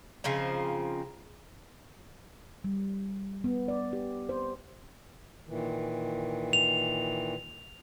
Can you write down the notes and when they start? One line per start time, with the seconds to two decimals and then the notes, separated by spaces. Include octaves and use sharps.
0.24 C#3 F3 C4 D#4
2.64 G3
3.44 B3
3.68 D5
3.93 G4
4.29 C5
5.47 A#2 D#3 E3
6.53 F7